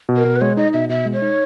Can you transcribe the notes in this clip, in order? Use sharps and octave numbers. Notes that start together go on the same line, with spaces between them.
B2
A#4
B2
B4
G#3 C#5
D#4 D#5
B2 E5
B2 E5
G#3
C#5
D#4